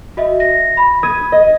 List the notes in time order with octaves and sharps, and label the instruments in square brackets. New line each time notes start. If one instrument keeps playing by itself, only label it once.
[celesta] F#4 D#5 E5
A#6
B5
[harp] D#6 G#6 D#7
D#5